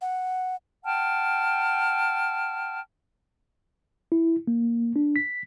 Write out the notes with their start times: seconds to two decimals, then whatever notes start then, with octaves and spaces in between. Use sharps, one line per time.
0.01 F#5
0.84 F#5 G5 A5 F6
4.12 E4
4.47 A#3
4.96 D4
5.16 B6